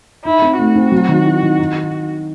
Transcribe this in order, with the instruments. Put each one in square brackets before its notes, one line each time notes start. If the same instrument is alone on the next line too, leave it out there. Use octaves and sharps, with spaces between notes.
[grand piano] D#4 [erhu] E4
[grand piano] C4
[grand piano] A3 [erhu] F#4
[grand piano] C4
F#3
D#3
E4
D#3
D#4